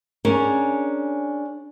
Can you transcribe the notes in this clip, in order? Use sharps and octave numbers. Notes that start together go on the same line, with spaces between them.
C#4 D4 G#4 A#4